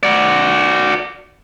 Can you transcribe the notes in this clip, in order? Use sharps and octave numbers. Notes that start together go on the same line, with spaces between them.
F#4 D5